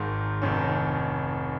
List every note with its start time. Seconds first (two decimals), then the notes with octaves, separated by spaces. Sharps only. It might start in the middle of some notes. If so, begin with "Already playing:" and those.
Already playing: G#1 G#2 D#3
0.42 F1 F2 D#3 C#4